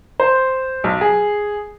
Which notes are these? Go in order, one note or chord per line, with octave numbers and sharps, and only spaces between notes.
C5
B1
G#4